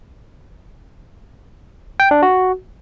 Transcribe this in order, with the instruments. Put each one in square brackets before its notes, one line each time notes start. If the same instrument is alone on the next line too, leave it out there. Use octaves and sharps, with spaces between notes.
[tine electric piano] G5
D4
F#4